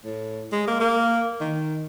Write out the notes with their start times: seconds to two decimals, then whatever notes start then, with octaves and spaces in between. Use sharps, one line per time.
0.05 A2
0.52 G#3
0.68 A#3
0.80 A#3
1.41 D#3